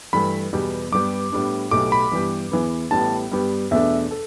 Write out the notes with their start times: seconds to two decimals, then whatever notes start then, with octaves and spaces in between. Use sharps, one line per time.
0.13 G2 E3 A3 B5
0.53 E2 B2 G3 B3 G4
0.92 G2 G3 B3 G4 D6
1.32 A2 G3 B3 D4
1.71 B1 A2 A3 G4 D6
1.92 B5
2.12 G2 E3 B3 G4
2.51 E2 E3 B3
2.91 A1 A2 G3 B3 E4 A5
3.31 G2 G3 B3 G4
3.71 E2 B2 A3 D4 E5
4.11 A4